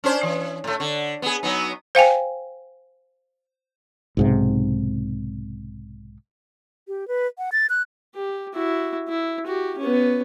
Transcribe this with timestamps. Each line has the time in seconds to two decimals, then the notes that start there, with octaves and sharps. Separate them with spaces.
0.04 C#4 D4 C5
0.23 E3
0.64 A2 A3
0.80 D3
1.22 B3 G#4
1.43 F#3 B3 D#4
1.95 C5 F5 G5 G#5
4.17 B1 G#2 C3
6.88 G4
7.08 B4
7.38 F#5
7.52 A6
7.70 F#6
8.15 G4
8.55 E4 F#4
9.08 E4
9.46 F#4 G4
9.78 B3 C#4